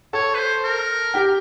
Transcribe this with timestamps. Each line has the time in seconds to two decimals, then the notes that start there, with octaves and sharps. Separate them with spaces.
0.13 A4 C#5 A5
0.35 B4
0.39 C5
0.64 A#4
1.14 G4 G5